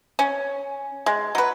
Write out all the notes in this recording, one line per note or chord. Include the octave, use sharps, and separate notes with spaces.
C#4
G#3
F#3 B4